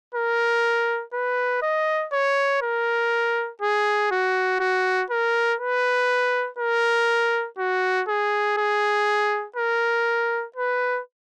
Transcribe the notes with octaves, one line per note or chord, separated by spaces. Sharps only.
A#4
B4
D#5
C#5
A#4
G#4
F#4
F#4
A#4
B4
A#4
F#4
G#4
G#4
A#4
B4